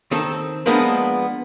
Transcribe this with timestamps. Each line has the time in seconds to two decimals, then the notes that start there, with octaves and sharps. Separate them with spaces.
0.11 D#3 C4 A4
0.66 F3 G#3 A#3 B3 D4